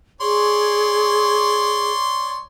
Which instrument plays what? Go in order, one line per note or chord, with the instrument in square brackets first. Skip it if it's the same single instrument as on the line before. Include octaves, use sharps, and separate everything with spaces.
[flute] G#4 [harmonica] C#5 D5 C6